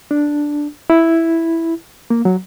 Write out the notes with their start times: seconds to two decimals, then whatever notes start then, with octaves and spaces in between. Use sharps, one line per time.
0.11 D4
0.90 E4
2.10 A#3
2.25 F#3